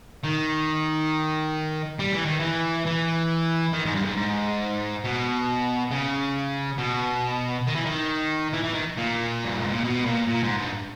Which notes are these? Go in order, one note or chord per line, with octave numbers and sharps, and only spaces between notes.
D#3
G3
E3
D#3
E3
E3
D#3
G#2
G2
G#2
G#2
B2
C#3
B2
D#3
E3
D#3
E3
E3
D#3
A#2
G2
G#2
A#2
B2
A#2
A#2
G#2
G2